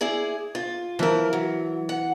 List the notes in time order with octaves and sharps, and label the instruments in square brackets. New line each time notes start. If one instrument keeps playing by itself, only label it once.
[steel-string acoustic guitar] E4 G#4 D5
F4
[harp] E3 E4 [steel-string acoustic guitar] F3 A#4
[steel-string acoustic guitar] F#3
F#5